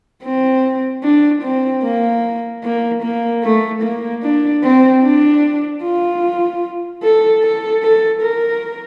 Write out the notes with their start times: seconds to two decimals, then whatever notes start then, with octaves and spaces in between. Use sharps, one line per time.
0.24 C4
1.04 D4
1.43 C4
1.83 A#3
2.64 A#3
3.03 A#3
3.44 A3
3.83 A#3
4.23 D4
4.63 C4
5.04 D4
5.83 F4
7.03 A4
7.43 A4
7.83 A4
8.22 A#4